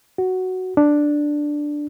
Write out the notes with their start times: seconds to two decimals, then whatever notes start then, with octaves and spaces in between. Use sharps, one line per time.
0.18 F#4
0.77 D4